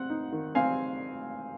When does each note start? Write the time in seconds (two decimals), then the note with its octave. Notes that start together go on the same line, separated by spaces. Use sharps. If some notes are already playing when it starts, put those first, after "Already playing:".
Already playing: C4 F#5
0.10 D#4
0.32 D#3
0.55 C4 F5 G#5